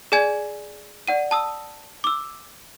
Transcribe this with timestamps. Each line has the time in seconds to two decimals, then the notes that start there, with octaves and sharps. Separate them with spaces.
0.12 G#4 D5 G#5 G#6
1.08 D5 F#5 D#7
1.31 A5 D#6 E6
2.04 D6 E6